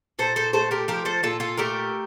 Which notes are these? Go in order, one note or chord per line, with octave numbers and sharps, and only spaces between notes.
A#2 A4 C5
A4 C5
A3 A4 C5
G4 A#4
F3 G4 A#4
A4 C5
A#2 F4 A4
F4 A4
A3 G4 A#4